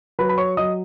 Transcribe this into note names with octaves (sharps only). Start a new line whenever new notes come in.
F#3 B4 B5
B5
C#5 C#6
F#3 D#5 D#6